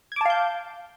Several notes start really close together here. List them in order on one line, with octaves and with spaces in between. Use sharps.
G#6 D6 A5 F5 G6